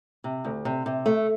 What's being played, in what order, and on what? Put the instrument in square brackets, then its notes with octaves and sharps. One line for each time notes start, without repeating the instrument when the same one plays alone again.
[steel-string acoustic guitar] C3
D2
C3
C3
A3